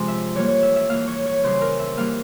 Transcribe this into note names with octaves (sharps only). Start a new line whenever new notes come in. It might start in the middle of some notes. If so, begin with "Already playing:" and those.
Already playing: C3 F3 G#3
E5
E3 G3 A#3 C#5
C#5
E5
E5
E3 A#3 F5
C#5
C#5
C#3 E3 G3 C5
A#4
E5
E3 G3 A#3 F5